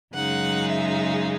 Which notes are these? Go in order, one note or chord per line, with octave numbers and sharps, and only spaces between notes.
F#2 C#3 G#3 D#4 F#5
E5